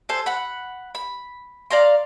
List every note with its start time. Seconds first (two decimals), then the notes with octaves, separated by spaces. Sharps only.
0.09 A4 C5 G#5
0.26 F#5 B5
0.95 B5
1.71 D5 F5 A#5 C6